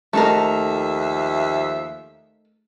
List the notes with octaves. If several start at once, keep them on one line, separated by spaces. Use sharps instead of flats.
D#2 F3 A3 D#4 A#4 E5